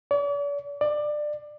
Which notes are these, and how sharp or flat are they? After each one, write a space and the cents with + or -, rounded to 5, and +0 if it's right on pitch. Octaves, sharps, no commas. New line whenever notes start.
D5 -45
D5 +20